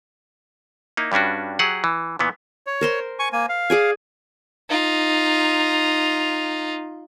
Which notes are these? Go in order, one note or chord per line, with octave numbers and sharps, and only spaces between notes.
A#3 D#4 E4
G2 G3 C#4 D4 F#4
F#3 G4 G#4 F#5
E3
A#2 E3 B3
C#5
A#4 C5 C6
G#5 C#6
A#3 G#5
F5
G#4 D5 G#5
D#4 F4